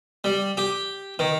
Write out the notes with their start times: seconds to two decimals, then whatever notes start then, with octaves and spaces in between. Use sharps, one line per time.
0.24 G3
0.57 G4
1.19 D#3